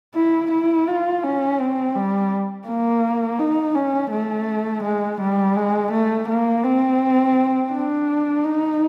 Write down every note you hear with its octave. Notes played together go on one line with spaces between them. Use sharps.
E4
E4
F4
C#4
C4
G3
A#3
D#4
C#4
A3
G#3
G3
G#3
A3
A#3
C4
D4
D#4